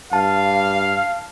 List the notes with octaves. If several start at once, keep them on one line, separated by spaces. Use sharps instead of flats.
G2 F5 A5